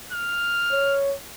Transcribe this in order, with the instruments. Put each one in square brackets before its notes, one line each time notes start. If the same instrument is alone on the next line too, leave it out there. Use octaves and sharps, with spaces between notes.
[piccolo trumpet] F6
[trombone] C#5